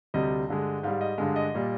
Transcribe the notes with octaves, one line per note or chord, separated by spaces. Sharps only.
D2 C3 G3 D#5
G2 D3 G#3
G#2 G3 F5
D#5
G2 D3 G#3 F5
D#5
A#2 G3